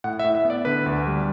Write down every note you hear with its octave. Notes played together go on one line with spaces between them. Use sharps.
A2 F#5
E5
A2
E5
B3
D5
D3 B4
D2
G3